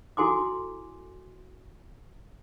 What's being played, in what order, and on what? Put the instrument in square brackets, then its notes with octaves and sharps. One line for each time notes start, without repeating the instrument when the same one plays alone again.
[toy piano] E4 F#4 A4 G#5 C6 D6